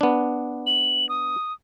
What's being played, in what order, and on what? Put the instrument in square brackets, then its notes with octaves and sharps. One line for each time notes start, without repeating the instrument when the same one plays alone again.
[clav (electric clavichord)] B3 D4
[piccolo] F#7
D#6